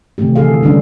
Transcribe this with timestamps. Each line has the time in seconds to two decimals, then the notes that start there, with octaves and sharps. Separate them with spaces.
0.18 C3 D#3 E3 A3 G4
0.36 D3 E3 G#4 A4 F5
0.63 D3 G3 G#3 C#4 D4